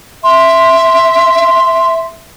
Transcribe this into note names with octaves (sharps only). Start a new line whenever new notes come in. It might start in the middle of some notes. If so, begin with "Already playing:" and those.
E5 C6